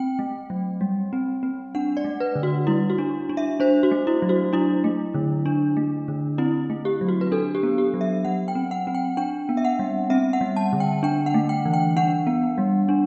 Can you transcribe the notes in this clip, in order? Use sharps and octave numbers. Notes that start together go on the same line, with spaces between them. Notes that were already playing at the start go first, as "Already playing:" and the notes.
Already playing: C4 G5
A3
F#3
G3
C4
C4
D4 F#5
D5
A3
B4
D3
F#4
G3 E4
F#4
D4
D4
E5
D4 C5
F#4
A3
E4
F#3
F#4
D4 E4
A3
D3
D4
A3
D3
C4 E4
A3
G4
F#3
F#4
B4
D4 A4
G4
B3
G4
F#3
E5
F#3 F#5
G5
C4
F#5
C4
G5
D4 G5
B3
E5
F#5
G3
C4 E5
F#5
G3
A5
D3
G5
D4 G5
F#5
A3
G5
E3
G5
D4 F#5
B3
G3
D4